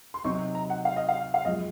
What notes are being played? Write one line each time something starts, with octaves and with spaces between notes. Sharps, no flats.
C6
C3 F#3 C4 D#4 F#4 C#6
A#5
F#5
F5
D#5
F5
F5
F#2 F3 G#3 D#5